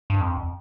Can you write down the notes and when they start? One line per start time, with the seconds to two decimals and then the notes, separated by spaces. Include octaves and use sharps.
0.10 G2
0.20 F2